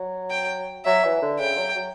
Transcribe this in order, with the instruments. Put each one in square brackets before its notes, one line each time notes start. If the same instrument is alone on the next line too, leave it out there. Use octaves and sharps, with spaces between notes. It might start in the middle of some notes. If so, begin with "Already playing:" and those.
Already playing: [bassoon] F#3
[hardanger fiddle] G5
[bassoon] F#3 [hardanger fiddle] E5
[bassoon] E3
D3
[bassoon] C#3 [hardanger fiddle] G5
[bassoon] F#3
F#3